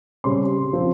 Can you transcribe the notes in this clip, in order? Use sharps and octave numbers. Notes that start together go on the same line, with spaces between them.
C#3 G3 C4 C6
F3 C4